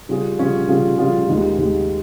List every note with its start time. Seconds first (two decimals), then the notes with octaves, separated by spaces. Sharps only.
0.09 C#3 G3 C#4 F4 G#4
0.38 C#3 G3 C#4 F4 G#4
0.68 C#3 G3 C#4 F4 G#4
0.98 C#3 G3 C#4 F4 G#4
1.28 D#2 D#3 G#3
1.58 D#2 D#3 G#3